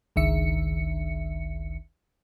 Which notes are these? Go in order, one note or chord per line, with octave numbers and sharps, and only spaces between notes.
G1 C#2 D#3 E5 C#7